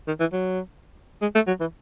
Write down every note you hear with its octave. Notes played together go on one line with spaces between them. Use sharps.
D#3
E3
F#3
G#3
A3
F#3
E3